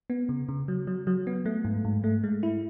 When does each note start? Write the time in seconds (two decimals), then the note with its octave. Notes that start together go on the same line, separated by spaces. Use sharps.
0.10 B3
0.29 C#3
0.49 C#3
0.68 F#3
0.87 F#3
1.07 F#3
1.27 B3
1.46 A3
1.65 G#2
1.85 G#2
2.04 A3
2.24 G#3
2.43 E4